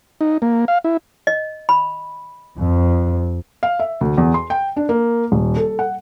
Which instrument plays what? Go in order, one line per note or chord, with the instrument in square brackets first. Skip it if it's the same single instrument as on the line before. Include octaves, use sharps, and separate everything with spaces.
[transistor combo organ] D#4
A#3
F5
E4
[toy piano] D#5
B5
[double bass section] F2
[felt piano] F5
E5
D2
E2
C6
G5
D4
A#3
D#1
A4
F#5